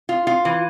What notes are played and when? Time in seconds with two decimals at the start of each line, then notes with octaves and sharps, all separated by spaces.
0.09 F4
0.27 F4
0.45 E3